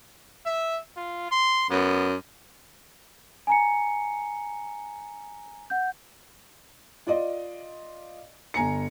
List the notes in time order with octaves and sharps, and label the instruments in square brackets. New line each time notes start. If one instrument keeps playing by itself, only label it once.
[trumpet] E5
F4
C6
[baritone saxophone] F#2 [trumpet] B3
[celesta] G#5 A#5 C#7
F#5 G6
[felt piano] F4 D5 D#5
G1 G#5 A#5 C#7